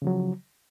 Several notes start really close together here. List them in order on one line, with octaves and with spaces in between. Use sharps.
C#3 F3 F#3